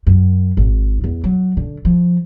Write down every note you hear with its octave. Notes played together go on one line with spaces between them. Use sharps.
F#2
G#1
E2
F#3
D3
F3